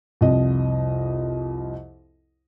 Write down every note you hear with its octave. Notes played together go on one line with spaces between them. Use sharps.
C2 F2 D#5